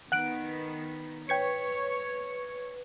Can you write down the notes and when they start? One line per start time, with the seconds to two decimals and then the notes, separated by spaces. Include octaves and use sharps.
0.12 D#3 B3 F#5 F#6 D7
1.29 B4 C#5 G5 G#6 C#7